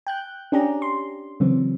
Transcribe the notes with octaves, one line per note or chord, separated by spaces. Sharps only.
G5 F#6 G6
C#4 D4 G4 G#4 A#5
C6
C#3 E3 F#3 C4